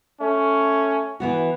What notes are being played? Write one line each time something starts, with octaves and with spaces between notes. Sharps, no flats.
A3 C#4
E3 B3 F#4